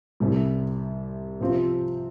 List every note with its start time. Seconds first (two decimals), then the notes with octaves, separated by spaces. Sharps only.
0.20 C2 C3 G3
1.41 C3 F3 C4 F4